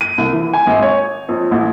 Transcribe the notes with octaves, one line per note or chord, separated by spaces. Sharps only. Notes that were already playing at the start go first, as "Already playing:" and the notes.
D#7
C2
E3
G#5
G#1
C#5
F2
A1